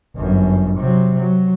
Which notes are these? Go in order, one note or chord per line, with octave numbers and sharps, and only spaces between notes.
G1 F#2
C3 F#3
F#3